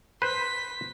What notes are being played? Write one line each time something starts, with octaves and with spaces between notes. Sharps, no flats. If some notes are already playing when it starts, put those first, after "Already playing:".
B4 C5 C6 B6